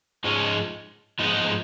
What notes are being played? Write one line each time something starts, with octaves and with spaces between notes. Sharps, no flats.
G#2 F3 G#3 C#4
G#2 F3 G#3 B3 D#4